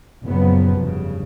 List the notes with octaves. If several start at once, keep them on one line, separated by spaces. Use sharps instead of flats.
F#1 A#2 C#3 F3 F#3 B3
F1 G2 C#3